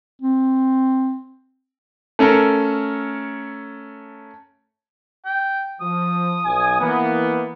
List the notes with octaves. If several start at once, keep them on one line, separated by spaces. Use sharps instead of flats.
C4
A3 C#4 A4 A#4
G5
F3 D#6
B1 G#5
E3 A#3 B3